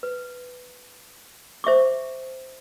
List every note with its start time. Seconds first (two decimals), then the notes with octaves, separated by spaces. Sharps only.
0.03 B4
1.64 C5 E5 C#6 D6